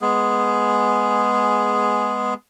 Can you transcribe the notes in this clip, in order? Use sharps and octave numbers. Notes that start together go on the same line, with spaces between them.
G#3 B3 G#4